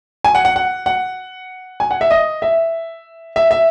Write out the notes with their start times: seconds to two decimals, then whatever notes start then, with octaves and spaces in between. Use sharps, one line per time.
0.24 G#5
0.35 F#5
0.45 F#5
0.56 F#5
0.86 F#5
1.80 G#5
1.91 F#5
2.01 E5
2.10 D#5
2.42 E5
3.36 E5
3.51 E5